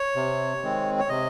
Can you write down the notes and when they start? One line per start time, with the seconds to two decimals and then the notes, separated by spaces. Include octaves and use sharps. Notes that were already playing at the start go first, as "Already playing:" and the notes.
Already playing: C#5
0.16 C3
0.63 D#3 G#3 C4
0.99 C#5
1.09 C3 D#5